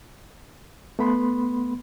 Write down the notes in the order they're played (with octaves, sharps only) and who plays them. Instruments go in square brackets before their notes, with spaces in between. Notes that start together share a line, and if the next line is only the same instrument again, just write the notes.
[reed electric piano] A3 B3 B5 C6